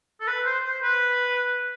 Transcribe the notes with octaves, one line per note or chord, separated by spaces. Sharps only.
A4
B4
C5
C5
B4